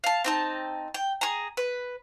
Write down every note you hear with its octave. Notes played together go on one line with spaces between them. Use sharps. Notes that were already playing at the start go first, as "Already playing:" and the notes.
F5 A5
C4 D#4 A5
G5
G#4 A#5
B4